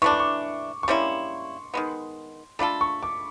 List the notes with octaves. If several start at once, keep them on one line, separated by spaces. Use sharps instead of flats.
E3 A3 D4 C#6
D6
C#6
C#6
G3 A#3 C#4 E4 C6
D#3 G#3 B3
A3 D4 F4 A4 B5
C#6
D6